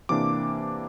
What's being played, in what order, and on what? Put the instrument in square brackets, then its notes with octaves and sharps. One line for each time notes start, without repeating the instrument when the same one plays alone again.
[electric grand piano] C3 E3 A#3 D4 D6